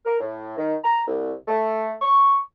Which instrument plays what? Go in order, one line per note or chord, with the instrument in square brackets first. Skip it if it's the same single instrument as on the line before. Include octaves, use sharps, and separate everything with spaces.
[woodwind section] A#4
A2
D#3
A#5
C2
A3
C#6